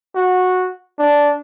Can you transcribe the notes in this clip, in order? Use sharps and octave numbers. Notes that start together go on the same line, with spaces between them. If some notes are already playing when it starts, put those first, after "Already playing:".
F#4
D4